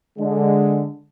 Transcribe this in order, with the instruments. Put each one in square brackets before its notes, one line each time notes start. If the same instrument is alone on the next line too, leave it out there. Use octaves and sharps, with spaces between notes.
[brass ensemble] D3 G#3